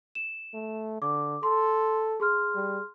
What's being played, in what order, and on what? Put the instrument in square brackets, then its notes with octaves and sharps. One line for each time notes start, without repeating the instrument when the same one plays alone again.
[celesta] E7
[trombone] A3
[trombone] D3 [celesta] D6
[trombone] A4 [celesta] C6
[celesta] G#4 C6 F6
[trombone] G3